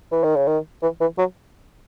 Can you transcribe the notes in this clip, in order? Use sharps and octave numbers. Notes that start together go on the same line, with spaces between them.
E3
D#3
C#3
D#3
E3
E3
F#3